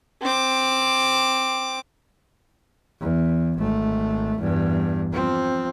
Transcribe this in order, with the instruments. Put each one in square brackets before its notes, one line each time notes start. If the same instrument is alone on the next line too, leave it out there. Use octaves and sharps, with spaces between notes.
[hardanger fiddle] C4 D6
[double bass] E2
G#1 A3
E2 G2
F3 C4